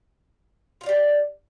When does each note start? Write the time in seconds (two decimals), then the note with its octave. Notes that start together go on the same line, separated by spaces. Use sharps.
0.81 F4
0.83 F5
0.86 D5
0.89 G4